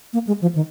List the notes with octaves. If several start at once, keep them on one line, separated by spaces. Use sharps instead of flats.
A#3
G#3
F3
D#3